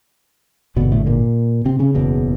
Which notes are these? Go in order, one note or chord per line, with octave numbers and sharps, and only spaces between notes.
G#1 G2 B2 D3 B3
A2 A3
A#2 A#3
C3 C4
C#3 C#4
F#1 E2 B2